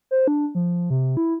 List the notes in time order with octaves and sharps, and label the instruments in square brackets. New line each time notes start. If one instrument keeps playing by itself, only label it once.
[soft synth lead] C5
D4
F3
C3
E4